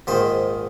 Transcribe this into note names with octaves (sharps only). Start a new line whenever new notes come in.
A#1 G#2 D#3 C5